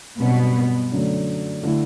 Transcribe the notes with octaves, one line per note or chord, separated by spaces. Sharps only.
G2 B2 F#3 B3 C4
F#2 D3 F#3 A3 D4
D3 A3 E4